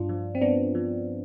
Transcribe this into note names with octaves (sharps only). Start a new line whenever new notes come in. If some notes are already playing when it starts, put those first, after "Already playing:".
Already playing: G2 D4 F4
F3
C4
G2 B3 D4
F3